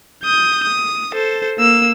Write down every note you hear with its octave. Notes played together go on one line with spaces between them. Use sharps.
D#6 G6
D#6
A4 C5
A#3 E6